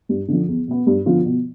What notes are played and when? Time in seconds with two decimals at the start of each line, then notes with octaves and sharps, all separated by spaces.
0.09 G2
0.28 D3 F3
0.48 E2
0.68 B2 B3
0.87 G2
1.06 D3 F3 B3 F4
1.26 B2